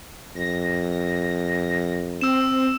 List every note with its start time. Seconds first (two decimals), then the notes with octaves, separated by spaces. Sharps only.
0.36 F2 A#6
2.21 C4 E6 E7